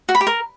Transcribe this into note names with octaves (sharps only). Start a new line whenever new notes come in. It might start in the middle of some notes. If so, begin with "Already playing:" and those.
F#4
B5
G4
A#4